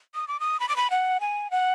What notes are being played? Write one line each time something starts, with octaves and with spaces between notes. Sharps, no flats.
D#6
D6
D#6
B5
D6
B5
F#5
G#5
F#5